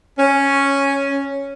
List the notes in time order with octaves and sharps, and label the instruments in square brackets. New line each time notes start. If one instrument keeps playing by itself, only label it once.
[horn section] C#4